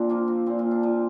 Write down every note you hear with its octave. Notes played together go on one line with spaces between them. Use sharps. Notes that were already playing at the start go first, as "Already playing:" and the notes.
Already playing: A#2 C4 D4
F3 A#3
C4
A#2 C4
F4
D4
F3